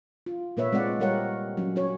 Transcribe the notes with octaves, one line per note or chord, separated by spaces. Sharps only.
F4
A#2 A#3 B4 C#5 E5
G#3 C4 F4 D5 F#5
G3 G4 A#4 C#5 F#5
F#3 C#4
C#4 F#4 C#5